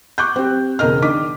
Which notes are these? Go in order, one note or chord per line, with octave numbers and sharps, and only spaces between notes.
C#6 D6 F#6 G6
C4 G4
E1 C#3 A#4 D#5 F6
D#3 D4 D#5 D6 B6